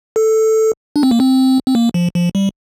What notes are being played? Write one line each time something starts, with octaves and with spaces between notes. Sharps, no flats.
A4
D4
C4
A#3
C4
C4
A#3
F3
F3
G3